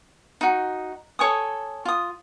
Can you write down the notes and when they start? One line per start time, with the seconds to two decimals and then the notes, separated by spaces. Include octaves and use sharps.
0.41 D#4 F#4
1.19 A4 C#5 G#5 D#6
1.85 F4 D#6